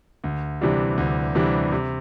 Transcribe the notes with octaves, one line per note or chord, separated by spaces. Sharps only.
D2
C3 E3 G3 D4
D2
C3 E3 G3 D4
C3